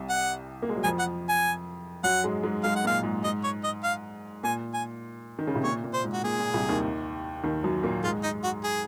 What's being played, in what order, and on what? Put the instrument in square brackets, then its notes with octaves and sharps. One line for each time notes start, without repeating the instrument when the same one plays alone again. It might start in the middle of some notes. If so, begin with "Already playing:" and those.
Already playing: [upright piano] C2 C3
[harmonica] F#5
[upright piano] A#3
G#3
F#3
[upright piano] F2 F3 [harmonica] G#5
[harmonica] F#5
G#5
[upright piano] F#2 F#3 [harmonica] F#5
[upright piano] G#2 G#3
G#2 G#3
[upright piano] G#2 G#3 [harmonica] F5
[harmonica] F#5
[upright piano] A#2 [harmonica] F5
[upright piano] G#2
[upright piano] G#2 [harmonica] D#5
[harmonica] C#5
D#5
F5
[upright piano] A#2 [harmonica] G#5
[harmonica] G#5
[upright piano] D#3
C#3
C3
[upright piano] A#2 [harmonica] C#5
[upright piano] A#2
[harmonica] C5
[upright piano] G#2
[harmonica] F#4
[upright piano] A#2 [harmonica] G#4
[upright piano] A#2
C2 C3
D#2 D#3
D#2 D#3
F#2 F#3
A#2 A#3
[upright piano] G#2 G#3 [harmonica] F4
[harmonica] D#4
F#4
G#4